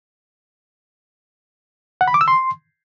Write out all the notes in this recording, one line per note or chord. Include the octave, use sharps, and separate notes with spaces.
F#5
B5
D6
E6
C6